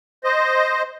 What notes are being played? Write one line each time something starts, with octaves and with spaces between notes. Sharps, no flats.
C5 D#5